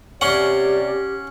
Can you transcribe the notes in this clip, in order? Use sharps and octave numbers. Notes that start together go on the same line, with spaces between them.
C3 C#4 G4 C#5 D5 F#5 C6 D6